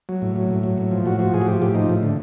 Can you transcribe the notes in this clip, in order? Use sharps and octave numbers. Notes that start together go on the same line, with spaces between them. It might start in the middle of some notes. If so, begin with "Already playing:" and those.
F#3
A2
F#3
A2
F#3
A2
F3
A2 F#4
F3 F#4
A2 G#4
F#4
F3 G4
A2 G4
F3 D#4
A2
D3